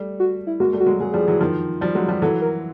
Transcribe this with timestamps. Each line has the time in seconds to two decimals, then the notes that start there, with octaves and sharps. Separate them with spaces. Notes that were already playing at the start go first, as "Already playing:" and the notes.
Already playing: G3 A3
0.20 F#4
0.47 E4
0.60 G#3 A#3 F#4
0.73 G3 A3
0.80 F#4
0.86 F#3 G#3
1.00 F#3 G#3 G#4
1.14 F3 G3
1.28 E3 F#3
1.41 D#3 F3
1.81 F3 G3
1.95 F#3 G#3
2.08 F3 G3
2.22 E3 F#3 A4
2.42 A#4